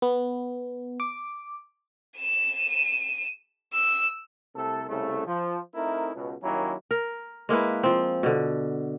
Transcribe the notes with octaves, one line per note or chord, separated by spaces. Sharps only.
B3
D6
D#7 E7
E6
C2 C3 A3 A4
C2 C#3 A3
F3
A3 C4 D#4 E4 A#4
C#2 B2
D#3 F#3 G3 A#3 C#4 E4
A#4
G#3 A#3 E4 B4
F3 C4
B2 D3